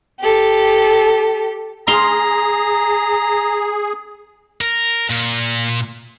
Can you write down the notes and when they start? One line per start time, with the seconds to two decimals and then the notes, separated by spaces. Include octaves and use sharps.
0.20 G4 A4
1.88 G#4 F5 A#5 C6
4.61 A#4
5.10 A#2